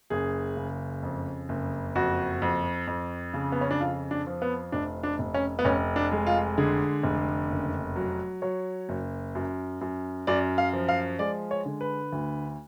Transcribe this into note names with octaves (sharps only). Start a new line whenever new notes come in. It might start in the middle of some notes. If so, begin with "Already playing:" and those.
F#1 G#4
C#3
F2
F#1
F2 F#4
F2
F2
C#3
B3
C#4
D4
F2 F4
D4
F3
B3
F1 D4
D4
F1
C#4
B3
F1 C#4
D4
G#3
F4
D3 G#4
F1
F#1
F#3
F#3 C#5
F#1
F#2
F#2
F#2 D5
F5
F3
F5
G#3 D5
C#5
D3
B4
D2